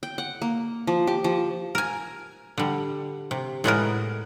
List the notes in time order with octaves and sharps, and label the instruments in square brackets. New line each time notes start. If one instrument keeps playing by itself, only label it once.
[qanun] G5
F#5
A#3
F3
G4
F3
[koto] A#4 G#5
D3 G3
C3
A2 G#3 B3 A#4